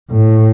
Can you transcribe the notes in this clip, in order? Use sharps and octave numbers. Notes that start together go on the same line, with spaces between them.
A2